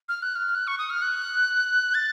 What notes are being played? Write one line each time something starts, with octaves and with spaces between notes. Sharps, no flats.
F6
F#6
F6
F#6
C#6
D#6
F6
F#6
A6